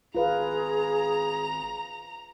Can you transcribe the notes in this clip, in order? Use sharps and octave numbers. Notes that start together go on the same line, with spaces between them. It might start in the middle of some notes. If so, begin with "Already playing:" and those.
G#1 F4 G#4 B4 F5 A#5